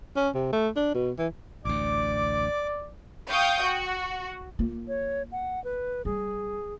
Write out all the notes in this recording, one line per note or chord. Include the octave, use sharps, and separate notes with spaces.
C#4
C3
A3
D4
B2
E3
A1 D2 D5 D6
F5 G5 C#6 D#6 G6
F#4
A#3 F4
C#5
F#5
B4
G3 G#4